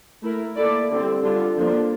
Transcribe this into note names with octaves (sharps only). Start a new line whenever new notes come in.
A3 E4 A#4
A#3 E4 A4 D5
D3 G3 C4
D3 G3 D4 F4
D3 F3 A#3 D4 F4